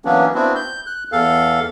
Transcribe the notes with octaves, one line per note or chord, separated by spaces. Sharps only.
E3 F#3 A#3 B3 C#4 D4
B3 C4 D4 E4 F#4
G6
F#6
E2 A4 F5